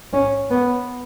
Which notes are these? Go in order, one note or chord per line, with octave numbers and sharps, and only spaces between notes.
C#4
B3